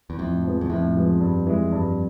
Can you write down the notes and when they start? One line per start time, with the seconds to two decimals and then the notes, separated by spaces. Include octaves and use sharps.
0.10 E2
0.19 F2 A2
0.44 F3 G#3 B3
0.61 E2
0.70 F2 A2
0.96 F3 G#3 B3
1.20 G2
1.47 E3 G#3
1.72 G2